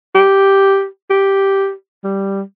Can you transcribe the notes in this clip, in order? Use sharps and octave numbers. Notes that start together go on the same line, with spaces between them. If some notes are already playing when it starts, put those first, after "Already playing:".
G4
G4
G3